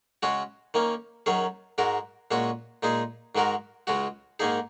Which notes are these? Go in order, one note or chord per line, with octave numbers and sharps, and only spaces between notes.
C#3 G#3 C#4 F#4
D#3 A#3 C#4
F#2 D#3 F#3 C#4 G#4
G#2 G#3 F#4 A#4
A#2 G#3 C#4 F#4
A#2 G#3 D#4 G#4
G#2 D#3 G#3 F#4 A#4
C#2 C#3 G#3 F#4
G#2 D#3 A#3 D#4 G#4